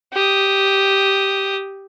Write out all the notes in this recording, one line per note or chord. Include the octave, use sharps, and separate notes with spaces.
G4 D#6